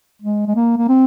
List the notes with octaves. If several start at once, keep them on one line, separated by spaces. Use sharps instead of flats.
G#3
G#3
A#3
A#3
C4